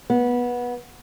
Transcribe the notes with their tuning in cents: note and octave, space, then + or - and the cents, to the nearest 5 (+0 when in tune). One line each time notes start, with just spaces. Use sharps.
B3 -20